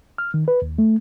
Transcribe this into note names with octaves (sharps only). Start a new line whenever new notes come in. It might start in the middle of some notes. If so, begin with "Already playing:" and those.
F6
D#3
B4
D#2
A3